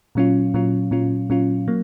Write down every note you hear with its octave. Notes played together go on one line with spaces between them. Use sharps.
A#2 F#3 C#4 F4
A#2 F#3 C#4 F4
A#2 F#3 C#4 F4
A#2 F#3 C#4 F4
F#3 A#3